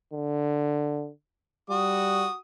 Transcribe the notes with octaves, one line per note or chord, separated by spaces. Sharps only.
D3
G3 F#4 D#6